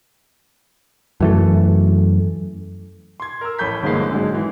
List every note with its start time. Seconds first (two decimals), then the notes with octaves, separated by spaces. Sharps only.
1.21 F#2 E3 A3
3.20 C6 G#6
3.41 A#4 E6
3.59 A1 A4 B5 G6 B6
3.82 G1 D3 F3 G#3 A#3 C7
4.11 G#2 D3 F#3 G#3
4.34 E3